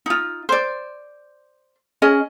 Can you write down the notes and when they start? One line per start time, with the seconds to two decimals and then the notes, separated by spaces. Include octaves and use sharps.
0.06 D#4 F4
0.49 C5 D5
2.02 C#4 G#4 D#5